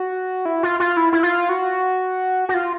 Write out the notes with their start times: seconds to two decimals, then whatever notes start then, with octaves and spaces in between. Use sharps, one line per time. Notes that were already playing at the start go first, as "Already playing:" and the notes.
Already playing: F#4
0.45 E4
0.63 F4
0.80 F4
0.97 E4
1.13 E4
1.23 F4
1.49 F#4
2.49 F#4
2.54 F4